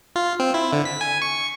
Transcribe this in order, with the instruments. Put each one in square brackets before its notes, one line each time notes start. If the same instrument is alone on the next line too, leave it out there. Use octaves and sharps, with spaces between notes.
[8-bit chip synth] F4
C4
E4
D3
B6
G#5
C#6